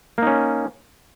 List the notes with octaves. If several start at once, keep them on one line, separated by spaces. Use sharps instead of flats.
A#3 C#4 D#4